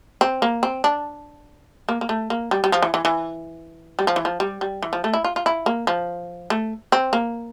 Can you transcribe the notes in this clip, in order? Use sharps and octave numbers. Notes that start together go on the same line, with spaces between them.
C4
A#3
C4
D4
A#3
A#3
A3
A#3
G3
G3
F3
E3
E3
E3
G3
F3
E3
F3
G3
G3
E3
F3
A3
E4
F4
F4
E4
A#3
F3
A3
C4
A#3